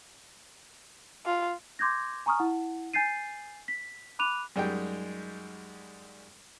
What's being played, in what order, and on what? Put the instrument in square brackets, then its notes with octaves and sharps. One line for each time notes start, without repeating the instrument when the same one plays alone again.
[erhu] F4
[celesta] C6 D6 G6 G#6 A#6
G#5 A#5 C#6 D#6 F6
E4 F#5
G#5 G6 A6 C7 D#7
B6
B5 D6 F#6 D#7 F7
[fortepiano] F#2 G3 G#3 D#4 G5